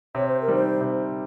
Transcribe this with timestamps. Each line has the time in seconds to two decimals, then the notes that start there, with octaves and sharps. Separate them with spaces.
0.15 C3 C#5
0.28 C5
0.41 A#4
0.48 D#3 G3
0.55 C5
0.81 C3